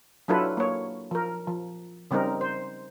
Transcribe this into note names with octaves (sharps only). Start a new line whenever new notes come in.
F#3 D4 E4 F4 A4 B4
A#3 C#5
F3 A#4
F3
C#3 G3 C4 D#4 A#4
C5